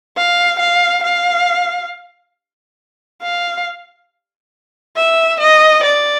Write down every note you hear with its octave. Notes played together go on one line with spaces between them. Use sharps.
F5
F5
F5
F5
E5
D#5
D5